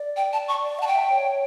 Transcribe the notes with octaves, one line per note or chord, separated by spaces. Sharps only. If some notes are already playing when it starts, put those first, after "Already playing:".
Already playing: D5
G5
A5
C#6
D5
F#5 A5
G5
E5
C#5